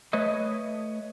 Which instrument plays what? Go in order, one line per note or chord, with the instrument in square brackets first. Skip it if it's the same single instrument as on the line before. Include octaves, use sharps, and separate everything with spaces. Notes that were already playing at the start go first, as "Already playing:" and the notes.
[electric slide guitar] A3 B4 C#5 D#5